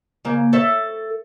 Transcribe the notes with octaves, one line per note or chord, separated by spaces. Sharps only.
C#3 A#3
A4 C#5 E5